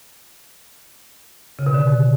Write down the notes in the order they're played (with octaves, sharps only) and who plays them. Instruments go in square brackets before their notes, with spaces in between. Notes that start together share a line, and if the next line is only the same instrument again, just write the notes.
[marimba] C#3
B2
D3